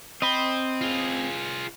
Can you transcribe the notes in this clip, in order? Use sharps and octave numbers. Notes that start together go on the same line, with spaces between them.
C4 D#5 B5
F4 G#4